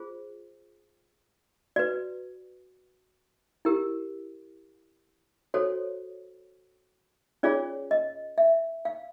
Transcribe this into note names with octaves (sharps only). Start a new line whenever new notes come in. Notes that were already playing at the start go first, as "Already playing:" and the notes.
Already playing: F4 G#4 C5
F#4 B4 D5
E4 G4 A#4
F#4 A4 C5 C#5
C#4 F4 G#4 C#5 D5
D#5
E5
F5